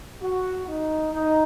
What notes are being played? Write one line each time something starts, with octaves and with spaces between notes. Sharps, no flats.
F#4
D#4
D#4